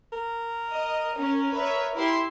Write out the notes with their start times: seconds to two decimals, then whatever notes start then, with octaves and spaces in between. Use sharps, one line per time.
0.13 A#4
0.72 D#5
1.17 C#4
1.56 B4 C#5 E5
1.97 E4 G4 C6